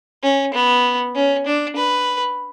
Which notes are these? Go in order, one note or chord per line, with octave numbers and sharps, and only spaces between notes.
C#4
B3
C#4
D4
B4